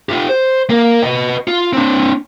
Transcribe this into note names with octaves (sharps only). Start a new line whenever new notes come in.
F4 G4
C5
A#3 A#4
B4 D#5
F4
C4 D4